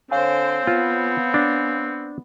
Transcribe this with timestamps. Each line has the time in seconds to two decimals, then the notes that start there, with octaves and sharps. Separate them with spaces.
0.11 D3 C4 C5 C#5 F5 G#5
0.67 B3 F4
1.34 D4